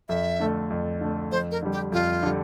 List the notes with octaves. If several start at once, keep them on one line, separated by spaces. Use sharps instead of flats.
F2 E5
D3 A3
F2
D3 A3
F2 C5
A#4
D3 G3
G4
F2 F4
D3 G3